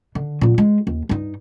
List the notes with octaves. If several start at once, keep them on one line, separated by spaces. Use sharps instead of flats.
D3
A#2 F#3
G#3
D#2
G2 D#4